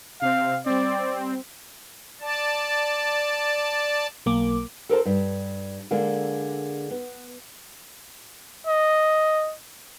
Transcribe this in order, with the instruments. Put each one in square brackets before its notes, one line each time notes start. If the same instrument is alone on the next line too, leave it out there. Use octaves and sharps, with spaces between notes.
[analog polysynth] C3 C4 [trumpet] F5
[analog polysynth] G3 C4 [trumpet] D5
[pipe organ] D5 A5
[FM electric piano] B1 A#3 D6
[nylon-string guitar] A4 A#4 C5 A5
G2
D3 G#3 A#3 D4 A4
B3
[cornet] D#5